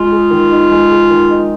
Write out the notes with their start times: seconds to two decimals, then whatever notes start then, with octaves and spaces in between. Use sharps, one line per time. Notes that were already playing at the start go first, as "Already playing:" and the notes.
Already playing: G#3 F4
0.11 G#4
0.30 D#3
0.51 D#4
0.71 G#3
0.90 G#4
1.10 D#3
1.29 D#4